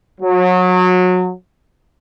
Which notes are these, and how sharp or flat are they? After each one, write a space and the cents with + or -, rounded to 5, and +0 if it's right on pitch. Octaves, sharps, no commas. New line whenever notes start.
F#3 -25